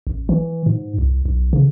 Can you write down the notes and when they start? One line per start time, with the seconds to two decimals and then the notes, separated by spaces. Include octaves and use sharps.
0.07 A1
0.29 E3
0.66 G#2
0.98 C2
1.25 B1
1.53 C#3